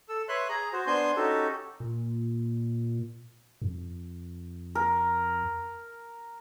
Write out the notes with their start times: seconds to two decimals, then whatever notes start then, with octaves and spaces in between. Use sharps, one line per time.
0.09 A4 E6
0.29 B4 C#5 E5 C6 F#6
0.49 G#4 A#5
0.73 F#4 C5
0.87 B3 D4 C5 G#5 C6 G6
1.17 C#4 D#4 F#4 G4 A4
1.80 A#2
3.62 F2
4.75 A#4